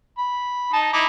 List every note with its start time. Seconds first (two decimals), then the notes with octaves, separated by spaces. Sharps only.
0.18 B5
0.73 D#4 A5
0.93 D#4 E4 D6